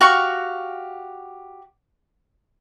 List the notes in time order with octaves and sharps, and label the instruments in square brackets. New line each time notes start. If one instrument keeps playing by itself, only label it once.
[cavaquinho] F#4 G4 F5 C#6